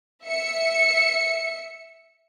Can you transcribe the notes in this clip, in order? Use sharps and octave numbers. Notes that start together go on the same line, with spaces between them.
E5 C#7